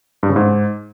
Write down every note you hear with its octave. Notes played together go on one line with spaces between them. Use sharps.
G2
C#3
G#2